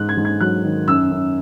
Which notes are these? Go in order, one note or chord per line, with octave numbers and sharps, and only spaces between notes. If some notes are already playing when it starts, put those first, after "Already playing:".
Already playing: G#2 F#6
G#6
G#2
G#6
F#3 F#6
D#3
F#2 E6
F#2